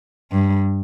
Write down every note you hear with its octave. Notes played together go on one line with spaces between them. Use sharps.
G2